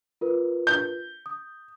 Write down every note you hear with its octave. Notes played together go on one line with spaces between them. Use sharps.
F4 A#4 B4
G6
D#6